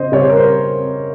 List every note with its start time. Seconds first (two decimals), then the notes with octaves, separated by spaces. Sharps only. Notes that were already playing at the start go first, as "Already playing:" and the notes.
Already playing: C#3 C5 D#5
0.12 C#3 G3 C#5
0.21 C5
0.29 A#4
0.37 C5